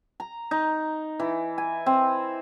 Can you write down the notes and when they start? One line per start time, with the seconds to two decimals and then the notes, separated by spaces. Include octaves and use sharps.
0.20 A#5
0.51 D#4
1.20 E3
1.58 G#5
1.86 C4